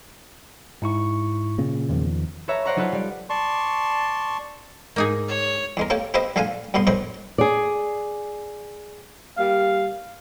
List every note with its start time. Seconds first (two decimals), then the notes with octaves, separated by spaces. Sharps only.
0.82 G#2 E4 C#6
1.58 A#2 C#3
1.89 E2 D#3 F3
2.48 A4 B4 C#5 E5 A#5
2.64 C5 D5 F#5 A#5 C#6
2.76 F#3 D#4 F4 A4 B4
2.92 G3 D5
3.30 D5 A5 C6 C#6
4.96 G#2 A#3 D#4 G#4
5.28 C#5
5.77 E2 G#3 A#4
5.90 A3 A#3 G4 C#5
6.14 C4 G4 B4 C5 D#5 E5
6.36 A#1 D3 A3 F5 F#5 G#5
6.74 D2 G2 B2 B3 C6
6.87 A#1 F#2 B2 C5 B5 C#6
7.38 G#4 D5
9.37 G3 A#3 F5